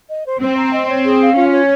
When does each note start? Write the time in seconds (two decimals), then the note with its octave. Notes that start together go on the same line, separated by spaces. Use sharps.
0.09 D#5
0.26 C5
0.41 C4 C5
0.57 A#5
0.73 D#5
0.88 C#5
1.05 G#4
1.21 F5
1.36 C#4 F4
1.52 C#5